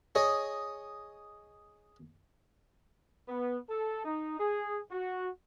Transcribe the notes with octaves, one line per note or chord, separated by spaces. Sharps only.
G#4 C#5 D#5
B3
A4
D#4
G#4
F#4